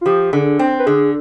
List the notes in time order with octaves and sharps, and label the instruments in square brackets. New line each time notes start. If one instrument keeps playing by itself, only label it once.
[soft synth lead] F4
[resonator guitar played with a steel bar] F3 [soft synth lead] G4
[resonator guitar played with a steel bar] D3 [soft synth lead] G#4
[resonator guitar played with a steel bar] C4
[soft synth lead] B4
[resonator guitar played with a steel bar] D3 [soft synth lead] G#4